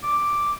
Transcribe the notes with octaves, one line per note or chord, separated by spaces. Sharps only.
D6